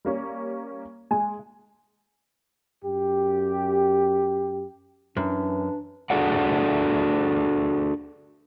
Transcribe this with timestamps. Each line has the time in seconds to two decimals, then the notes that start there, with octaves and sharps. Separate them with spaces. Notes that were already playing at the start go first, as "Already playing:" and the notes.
0.05 G3 A#3 C#4
1.11 G#3 G#5
2.83 F#2 G4
5.17 F#2 E3 D4
6.10 D4 F#4 G#4 A4 D5 F#5